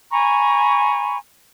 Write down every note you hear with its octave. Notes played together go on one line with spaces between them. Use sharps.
G#5 A#5 B5 C#6